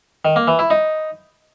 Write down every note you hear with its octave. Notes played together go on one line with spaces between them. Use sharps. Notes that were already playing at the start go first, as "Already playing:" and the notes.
D#3
A#3
E3
E4
D#4